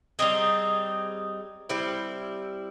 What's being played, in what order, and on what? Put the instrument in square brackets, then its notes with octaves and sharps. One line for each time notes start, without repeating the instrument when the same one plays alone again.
[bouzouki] G3 C4 D#4 G#4
G3 C4 E4